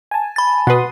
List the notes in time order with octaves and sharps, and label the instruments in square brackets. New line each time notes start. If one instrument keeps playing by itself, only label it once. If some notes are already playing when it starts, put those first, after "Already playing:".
[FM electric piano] G#5 A5
[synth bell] B5 A6
[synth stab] B2 B4 [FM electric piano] F#5 C6 D#6